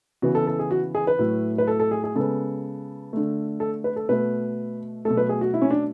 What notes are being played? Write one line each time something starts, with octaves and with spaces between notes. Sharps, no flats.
C#3 E3 B3 F#4
A4
A4
G#4
F#4
G#4
B4
A2 F#3 A3
B4
A4
A4
G#4
G#4
C#3 G#3 B3 A4
D3 A3
A4
B4
A4
B2 A3 B4
B2 F#3 A3 A4
B4
G#4
F#4
E4
C#4
D4